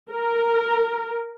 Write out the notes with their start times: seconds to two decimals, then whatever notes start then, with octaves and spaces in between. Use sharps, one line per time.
0.11 A#4